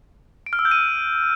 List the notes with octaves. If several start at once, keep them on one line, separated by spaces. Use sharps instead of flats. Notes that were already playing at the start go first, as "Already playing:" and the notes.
D7
F6
E6
G6
D#7